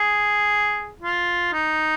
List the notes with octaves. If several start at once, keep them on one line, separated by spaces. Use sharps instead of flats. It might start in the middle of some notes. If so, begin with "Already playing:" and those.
Already playing: G#4
F4
D#4